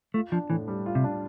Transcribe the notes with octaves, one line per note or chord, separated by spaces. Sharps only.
A3 F4
F3 D4
A2 E3
G3
F4
C3
D4